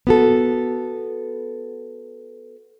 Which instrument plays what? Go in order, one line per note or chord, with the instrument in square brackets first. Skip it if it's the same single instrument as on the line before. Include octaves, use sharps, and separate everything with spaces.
[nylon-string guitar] B3 F#4 A4